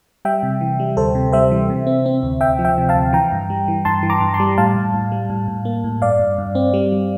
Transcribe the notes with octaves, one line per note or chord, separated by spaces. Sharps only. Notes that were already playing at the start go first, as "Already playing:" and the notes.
G3 E5 G5
C3
E3
G3
D2 A4 C5
C3
G3 C5 E5
E3
C3
C4
C4
D2
D2 E5 G5
F3
E5 G5
C3
F5 A5
D2
E3 G5 A#5
G2
G3
E3
G2 A5 C6
E3
A#5 D6
G2
A5 C6
G3
A2 F5 A5
A2
A2
G3
A2
A2
A#3
A2
G2 D5 F5
G2
G2
C4
G3
G3